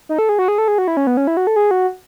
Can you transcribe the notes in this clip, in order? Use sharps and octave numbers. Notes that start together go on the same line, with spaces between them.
D#4
A4
G#4
F#4
G#4
A4
G#4
F#4
E4
C#4
B3
C#4
E4
F#4
A4
G#4
F#4